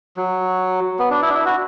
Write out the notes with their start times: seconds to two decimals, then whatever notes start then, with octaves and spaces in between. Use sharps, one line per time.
0.17 F#3
0.99 B3
1.10 D4
1.22 E4
1.30 D4
1.34 E4
1.46 F#4